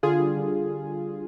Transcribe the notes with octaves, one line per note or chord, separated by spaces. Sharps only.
D3 F4 G#4
G3
D3